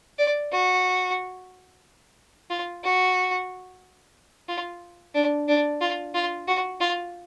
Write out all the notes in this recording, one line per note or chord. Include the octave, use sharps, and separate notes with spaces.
D5
F#4
F4
F#4
F4
D4
D4
F4
F4
F#4
F4